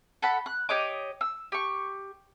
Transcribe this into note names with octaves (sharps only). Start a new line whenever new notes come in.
A4 F#5 B5
F#6
G4 C#5 D#5 D6
E6
G4 C#6